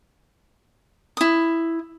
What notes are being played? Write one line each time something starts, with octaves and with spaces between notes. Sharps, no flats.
E4 D#6